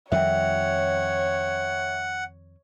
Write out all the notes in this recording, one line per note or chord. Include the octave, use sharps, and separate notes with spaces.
F2 D#3 G3 C#5 E5 F#5 G5